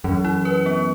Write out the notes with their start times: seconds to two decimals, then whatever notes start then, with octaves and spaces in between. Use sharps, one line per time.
0.04 F#2 E3
0.25 E4
0.45 B4
0.66 B3